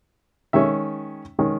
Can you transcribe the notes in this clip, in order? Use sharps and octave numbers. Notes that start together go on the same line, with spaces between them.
D#3 G#3 C#4 E5
D#3 G#3 C#4